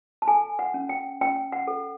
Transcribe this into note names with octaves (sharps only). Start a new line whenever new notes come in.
A5
A4 G#5
F#5
C#4
G5
C#4 G5
F#5
A4